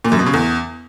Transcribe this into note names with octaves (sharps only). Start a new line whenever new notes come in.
A#2
F#2
B2
C#3
E2